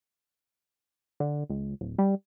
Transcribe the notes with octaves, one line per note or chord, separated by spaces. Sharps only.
D3
C#2
D1
G3